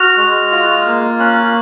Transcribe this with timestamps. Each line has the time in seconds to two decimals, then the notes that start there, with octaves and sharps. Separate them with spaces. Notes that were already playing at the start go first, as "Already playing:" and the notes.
Already playing: F#4 F6
0.17 G#3
0.52 F4
0.86 A#3
1.19 C#4 F#6